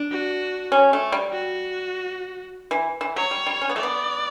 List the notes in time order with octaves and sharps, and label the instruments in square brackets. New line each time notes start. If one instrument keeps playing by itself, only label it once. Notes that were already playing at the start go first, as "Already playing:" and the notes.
Already playing: [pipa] D4
[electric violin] F#4
[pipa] C#4
A3
G3
[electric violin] F#4
[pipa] E3
E3
[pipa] F#3 [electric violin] C#5
[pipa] G3
G3
C#4
B3
[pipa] A3 [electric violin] D5
[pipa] B3